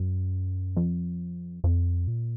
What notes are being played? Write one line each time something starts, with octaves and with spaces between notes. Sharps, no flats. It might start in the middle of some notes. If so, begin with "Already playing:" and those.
Already playing: F#2
F2
F2
A#2